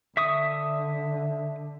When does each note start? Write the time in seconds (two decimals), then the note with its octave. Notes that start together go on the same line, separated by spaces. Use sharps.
0.17 D3 E5 C#6 D#6